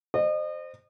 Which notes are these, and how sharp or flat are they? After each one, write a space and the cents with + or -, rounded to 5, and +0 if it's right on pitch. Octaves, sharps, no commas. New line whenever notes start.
C5 +0 D#5 -35